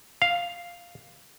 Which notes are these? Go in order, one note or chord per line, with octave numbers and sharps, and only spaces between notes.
F5